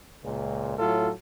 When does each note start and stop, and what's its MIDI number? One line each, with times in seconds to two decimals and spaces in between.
0.23 0.74 37
0.23 0.74 46
0.78 1.11 45
0.78 1.11 54
0.78 1.11 65
0.78 1.11 69